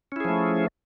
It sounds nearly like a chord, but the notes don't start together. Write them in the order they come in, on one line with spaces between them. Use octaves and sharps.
C#4 E4 G#4 F3 A3